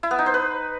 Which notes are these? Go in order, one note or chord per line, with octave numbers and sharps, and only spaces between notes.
E4
B3
D#4
C5
B4